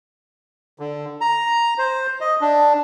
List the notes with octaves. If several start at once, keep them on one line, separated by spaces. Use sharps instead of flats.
D3
A#5
C5
D#5
D4